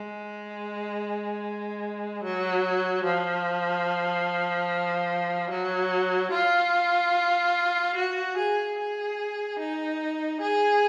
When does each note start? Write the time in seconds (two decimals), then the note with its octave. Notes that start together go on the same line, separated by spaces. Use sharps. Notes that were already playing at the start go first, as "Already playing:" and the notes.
Already playing: G#3
2.23 F#3
3.05 F3
5.51 F#3
6.32 F4
7.96 F#4
8.37 G#4
8.78 G#4
9.59 D#4
10.41 G#4